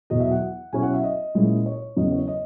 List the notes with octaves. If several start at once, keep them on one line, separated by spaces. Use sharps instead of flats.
E2 B2 F#3 D#5
E5
F#5
B2 F#3 C#4 E4 G#5
F#5
E5
D#5
A#2 G#3 C#4 E4
C#5
E2 C#3 F#3 D#5
C#5
D#5